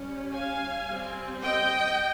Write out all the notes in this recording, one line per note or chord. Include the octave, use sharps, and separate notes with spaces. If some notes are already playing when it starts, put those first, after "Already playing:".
Already playing: G3 C#4
F5 G#5
G3 C4
D#5 G5